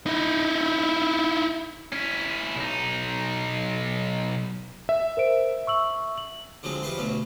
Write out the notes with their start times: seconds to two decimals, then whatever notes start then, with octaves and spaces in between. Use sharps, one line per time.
0.06 D#4 E4
1.92 C#4 E4
2.56 B1 D#4
4.89 E5
5.17 A#4 C5 D7
5.67 C#6 E6 F#7
6.18 F#7
6.63 D3 F3 F#3 G#3 C4
6.83 F3 G3 E4 B4 C6
6.97 D2 B2 F#3 C#4